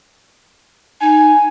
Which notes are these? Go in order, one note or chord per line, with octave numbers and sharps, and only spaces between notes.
D#4 G#5